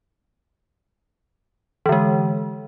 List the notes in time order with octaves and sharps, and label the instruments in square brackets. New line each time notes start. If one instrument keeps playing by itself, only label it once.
[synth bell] E3
D3
G#3